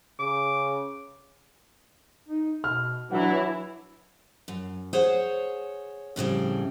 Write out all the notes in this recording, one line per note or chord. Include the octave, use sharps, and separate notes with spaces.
C#3 D6
D#4
B2 F6
E3 F#3 D4 E4 F#5
F#2
G#4 C5 C#5 F#5
F2 A2 C#3 G3